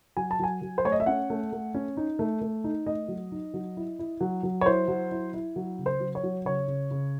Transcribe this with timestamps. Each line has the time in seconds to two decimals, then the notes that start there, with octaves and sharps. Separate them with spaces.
0.17 F#3 G#5
0.31 A5
0.39 F#3 G#5
0.61 F#3
0.78 C5
0.85 A3 C#5
0.92 D#5
1.00 E5
1.06 C#4 F#5
1.30 A3
1.52 A3
1.74 C#4
1.97 D#4
2.19 A3
2.41 A3
2.64 D#4
2.86 A3 D#5
3.08 F#3
3.32 D#4
3.54 F#3
3.77 E4
3.99 E4
4.21 F#3
4.43 F#3
4.61 C#5
4.65 E4 C5
4.88 F#3
5.12 E4
5.34 E4
5.56 F#3
5.79 C#3
5.86 C5
6.00 F#3
6.15 C#5
6.23 F#3
6.45 C#3 C#5
6.68 C#3
6.91 C#3